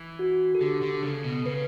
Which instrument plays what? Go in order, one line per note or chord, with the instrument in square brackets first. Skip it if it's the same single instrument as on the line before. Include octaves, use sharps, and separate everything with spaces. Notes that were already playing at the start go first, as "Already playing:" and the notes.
Already playing: [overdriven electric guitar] E3
[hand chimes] F#4
A4
[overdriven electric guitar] D3 [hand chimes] G4
[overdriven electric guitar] D3
[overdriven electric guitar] C#3 [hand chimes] A4
[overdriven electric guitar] B2
[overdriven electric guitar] C#3 [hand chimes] B4